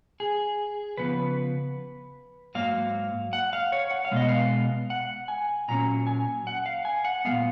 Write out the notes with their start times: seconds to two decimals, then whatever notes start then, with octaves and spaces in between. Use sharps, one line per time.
0.20 G#4
0.97 C#3 F3 B3 B4
2.55 G#2 F#3 A#3 F5
3.33 F#5
3.53 F5
3.72 C#5
3.91 F#5
4.05 F5
4.11 B2 G#3 B3 D#5
4.28 F5
4.90 F#5
5.28 G#5
5.68 A#2 F#3 A#3 C#4 A#5
6.07 G#5
6.47 F#5
6.66 F5
6.85 G#5
7.05 F#5
7.25 G#3 B3 F5
7.29 A#2